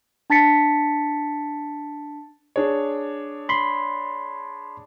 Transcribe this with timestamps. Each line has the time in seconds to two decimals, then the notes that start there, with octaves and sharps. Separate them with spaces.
0.30 D4 A5 A6 B6 C#7
2.56 D4 G#4 C#5
3.49 B5 C6